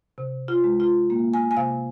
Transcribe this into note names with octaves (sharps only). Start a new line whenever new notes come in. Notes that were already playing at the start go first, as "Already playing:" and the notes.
C3
F4
G#3
F4
A#3
G#5
G#5
C3 F5